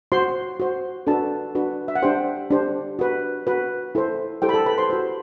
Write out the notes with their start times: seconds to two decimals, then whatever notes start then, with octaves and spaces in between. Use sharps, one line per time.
0.12 F#4 C5 C6
0.60 F#4 C5
1.07 D4 F#4 A4 B4 A5
1.55 D4 F#4 B4
1.88 E5
1.95 F#5
2.02 D4 G4 C5 G5
2.51 D4 G4 C5
2.99 F#4 B4
3.47 F#4 B4
3.95 E4 A4 C5
4.42 E4 G4 A4 C5 G5
4.49 B5
4.54 A4 A5
4.66 B4 B5
4.78 C5 C6
4.90 F#4 C5